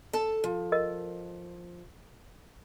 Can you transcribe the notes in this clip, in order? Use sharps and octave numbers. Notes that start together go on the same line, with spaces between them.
A4 A5
F3
A#4 D#5